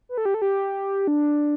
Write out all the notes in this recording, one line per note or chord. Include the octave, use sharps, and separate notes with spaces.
B4
A4
G4
A4
G4
D4